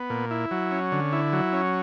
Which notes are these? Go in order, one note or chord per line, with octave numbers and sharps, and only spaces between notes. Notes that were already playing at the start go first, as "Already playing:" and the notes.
Already playing: B3
A#2
E4
F#3
C#4
D3
E4
F#3
C#4